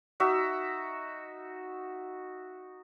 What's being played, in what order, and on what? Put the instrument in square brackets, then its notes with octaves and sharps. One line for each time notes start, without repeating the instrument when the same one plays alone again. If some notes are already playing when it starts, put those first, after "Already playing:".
[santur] D#4 F#4 E5